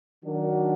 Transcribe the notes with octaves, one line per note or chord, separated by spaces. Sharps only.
D#3 F#3 D4 F#4 A#4